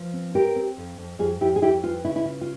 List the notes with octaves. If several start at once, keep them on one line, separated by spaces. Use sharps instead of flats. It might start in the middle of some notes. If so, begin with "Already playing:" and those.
Already playing: F3
C4
C4 G4 A#4
C4
F2
F2
F2 F4 G#4
F2 E4 G4
G#4
F2 E4 G4
E3 F4
C#3 E4
E4
C#3 F4
F4